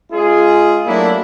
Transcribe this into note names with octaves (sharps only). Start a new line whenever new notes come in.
G#3 C#4 F4 G#4
F#3 A3 A#3 D4 E4